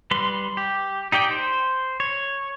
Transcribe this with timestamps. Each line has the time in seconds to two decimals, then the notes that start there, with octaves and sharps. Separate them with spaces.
0.11 G3 B4 C6
0.57 G4
1.12 D#4 G4 D5 G5
1.31 C5
2.00 C#5